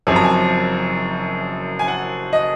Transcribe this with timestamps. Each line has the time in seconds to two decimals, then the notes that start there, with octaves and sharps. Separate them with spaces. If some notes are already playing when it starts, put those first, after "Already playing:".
0.07 F#1 F#2 F3 C4 G#5
0.16 A#5
0.24 G#5
1.79 G#5
1.88 F#5
2.33 D#5